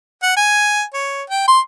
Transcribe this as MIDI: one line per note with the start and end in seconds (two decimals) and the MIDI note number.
0.23 0.35 78
0.37 0.83 80
0.94 1.23 73
1.30 1.47 79
1.48 1.60 84